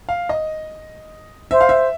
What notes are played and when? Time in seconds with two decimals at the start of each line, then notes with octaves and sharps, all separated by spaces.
0.09 F5
0.29 D#5
1.51 C5 E5
1.61 F5
1.69 E5